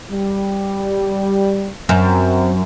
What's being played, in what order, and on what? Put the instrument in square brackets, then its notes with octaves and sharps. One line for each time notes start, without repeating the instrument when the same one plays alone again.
[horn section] G3
[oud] F#2 [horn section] C4